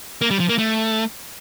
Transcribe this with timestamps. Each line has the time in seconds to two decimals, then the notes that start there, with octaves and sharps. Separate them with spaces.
0.21 A#3
0.31 G3
0.40 F3
0.49 A#3
0.58 A3